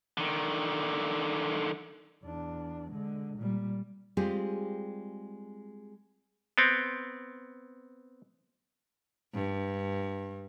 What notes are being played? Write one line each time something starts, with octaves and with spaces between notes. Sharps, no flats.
D3 D#3
E2 D4
D3 G#3
A#2 G3
G3 G#3 C4 F4 G4 G#4
B3 C4
G2